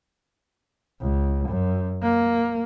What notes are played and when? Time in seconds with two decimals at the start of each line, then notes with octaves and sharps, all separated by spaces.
1.02 C#2
1.49 F#2
2.03 A#3